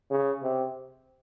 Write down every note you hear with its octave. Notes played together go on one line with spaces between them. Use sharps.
C#3
C3